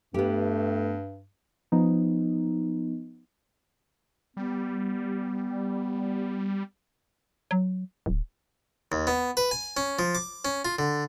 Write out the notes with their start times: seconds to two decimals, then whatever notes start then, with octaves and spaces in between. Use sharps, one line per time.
0.14 G2 A3 B3 G4
1.72 F3 B3 D#4
4.37 G3 B3
7.51 F#3
8.06 D1
8.92 D#2
9.07 B3
9.37 B4
9.51 G#5
9.77 C#4
9.99 F3
10.15 D6
10.45 C#4
10.65 F4
10.79 D3